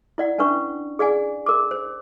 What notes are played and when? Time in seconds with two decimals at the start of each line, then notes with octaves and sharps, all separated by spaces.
0.18 E4 D5 F#5
0.38 C#4 D4 B4 C#6
0.99 G#4 D5 F#5 G#5
1.46 A#4 D6
1.71 C5